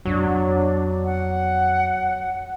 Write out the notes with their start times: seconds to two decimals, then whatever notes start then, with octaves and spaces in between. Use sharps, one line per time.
0.05 F2 F#3 B3 D4
1.05 F#5